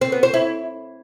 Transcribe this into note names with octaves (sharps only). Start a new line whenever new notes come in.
C4
B3
C5
E4